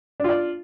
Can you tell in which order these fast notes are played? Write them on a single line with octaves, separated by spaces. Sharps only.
D4 F4 D5